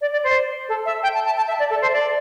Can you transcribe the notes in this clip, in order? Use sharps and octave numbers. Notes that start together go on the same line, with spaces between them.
D5
D5
C5
A4
E5
G5
A5
A5
A5
E5
D5
A4
C5
D5